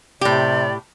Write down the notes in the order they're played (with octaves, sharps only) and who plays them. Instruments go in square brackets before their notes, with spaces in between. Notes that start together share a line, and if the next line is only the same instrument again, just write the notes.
[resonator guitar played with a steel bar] A2 G4 [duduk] C3 [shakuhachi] D5